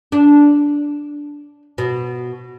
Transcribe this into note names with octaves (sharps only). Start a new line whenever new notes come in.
D4
B2